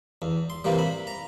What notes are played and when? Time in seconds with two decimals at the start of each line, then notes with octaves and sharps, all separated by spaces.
0.22 E2
0.50 C6
0.64 C3 E3 G3 A#3
0.79 B5
1.07 A#5